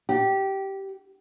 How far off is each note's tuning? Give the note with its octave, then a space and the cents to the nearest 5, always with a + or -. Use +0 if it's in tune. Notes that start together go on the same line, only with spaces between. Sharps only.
G4 -15